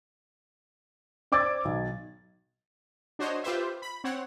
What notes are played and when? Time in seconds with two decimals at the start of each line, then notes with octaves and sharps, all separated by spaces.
1.32 C5 D5 D6 E6 G#6 A6
1.65 B1
3.19 D4 F#4 C5 C#5 D#5
3.44 F4 G4 B4 C5 E5
3.82 B5
4.04 C4 C#5 F#5